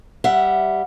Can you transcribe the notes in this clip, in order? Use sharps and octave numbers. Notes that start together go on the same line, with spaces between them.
G3 E5 F#5